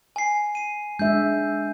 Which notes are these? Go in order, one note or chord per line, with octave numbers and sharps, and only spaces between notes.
G#5 C7
C7 D#7
G#3 D4 E5 G6